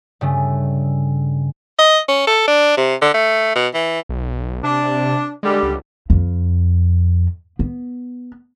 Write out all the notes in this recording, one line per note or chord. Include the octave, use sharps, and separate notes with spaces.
G2 C#3 A3
D#5
C#4
A4
D4
C3
D3
A3
B2
E3
B1
C3 D4
D3 G3 G#3
C#2
F2
B3